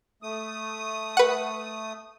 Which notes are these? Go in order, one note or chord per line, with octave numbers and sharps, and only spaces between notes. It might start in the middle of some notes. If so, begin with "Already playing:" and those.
A3 D#6
B4 F#5